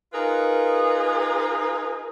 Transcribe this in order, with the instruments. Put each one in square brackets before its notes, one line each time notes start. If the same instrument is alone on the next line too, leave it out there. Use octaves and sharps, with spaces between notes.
[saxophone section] D#4 F4 G#4 A#4 B4